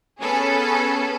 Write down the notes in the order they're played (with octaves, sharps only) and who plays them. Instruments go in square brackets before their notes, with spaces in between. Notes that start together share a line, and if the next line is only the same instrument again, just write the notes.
[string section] B3 C#4 G#4 A4 B4